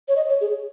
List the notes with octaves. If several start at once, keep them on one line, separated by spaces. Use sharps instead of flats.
C#5
D#5
C#5
G#4